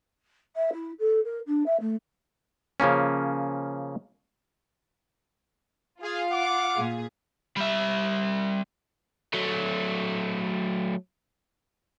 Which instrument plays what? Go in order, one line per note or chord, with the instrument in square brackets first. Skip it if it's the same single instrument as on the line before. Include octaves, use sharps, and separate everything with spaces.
[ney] E5
E4
A4
A#4
D4
E5
A3
[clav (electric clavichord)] C#3 F3 A#3 C#4
[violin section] F4 F5 [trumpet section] G#4
[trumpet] F#5 [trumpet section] D6
[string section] A#2 G#4
[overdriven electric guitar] G3 E5
F#3 A3